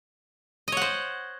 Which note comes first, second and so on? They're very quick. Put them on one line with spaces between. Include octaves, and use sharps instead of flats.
D#5 C#5 F#5 C5